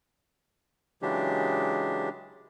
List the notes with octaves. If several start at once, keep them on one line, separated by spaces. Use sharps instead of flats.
C#3 E3 F#3 G#3 D4 G4